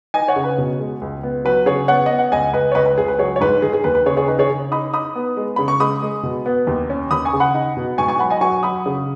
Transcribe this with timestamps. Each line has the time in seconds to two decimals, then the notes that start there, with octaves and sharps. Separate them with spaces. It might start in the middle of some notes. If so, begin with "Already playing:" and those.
0.14 D#4 D#5 G#5
0.28 C#5 F#5
0.36 C#3
0.44 B4
0.58 B2
0.80 G#3
1.01 C#2
1.23 B3
1.45 F#3 B4
1.66 C#3 G#4 C#5
1.88 B3 C#5 F#5
2.06 B3 D#5
2.19 F#5
2.32 C#2 D#5 G#5
2.53 C#2 B4 D#5
2.72 C#5
2.75 C#2 B4 D#5
2.86 B4
2.98 C#2 G#4
3.08 B4
3.19 F#3 G#4 C#5
3.36 C#5
3.40 G#2 B4
3.62 D#3 G#4
3.73 G#4
3.84 D#2 B4
3.95 B4
4.06 C#3 G#4 C#5
4.17 G#4 C#5
4.28 D#4 B4
4.39 G#4 C#5
4.50 C#3
4.71 D#4 B5 D#6
4.93 D#4 B5 D#6
5.15 B3
5.37 G#3
5.56 C#3 B5
5.68 C#6
5.80 G#3 B5 D#6
6.02 G#3
6.23 B2
6.46 B3
6.67 D#2
6.90 C#4
7.11 D#2 B5 D#6
7.25 G#5 C#6
7.33 C#3
7.40 F#5 B5
7.54 D#4
7.77 B2
7.98 G#2 G#5 C#6
8.08 G#5 C#6
8.19 F#3 F#5 B5
8.30 D#5 G#5
8.41 F#3 G#5 C#6
8.63 F#3 B5 D#6
8.86 C#3